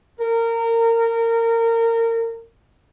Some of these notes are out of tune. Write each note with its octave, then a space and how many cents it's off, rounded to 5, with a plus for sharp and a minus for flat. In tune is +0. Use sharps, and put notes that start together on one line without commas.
A#4 -25